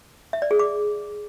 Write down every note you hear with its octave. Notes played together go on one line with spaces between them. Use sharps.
E5
D5
G#4
D6